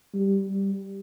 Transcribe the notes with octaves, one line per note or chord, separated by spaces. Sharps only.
G3
G3